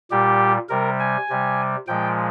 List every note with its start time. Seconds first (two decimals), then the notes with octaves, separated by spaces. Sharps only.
0.11 A#2 G3 G4
0.69 C3 G3 A#4
1.00 G#5
1.29 C3 G3
1.88 A#2 F3 G#3 G5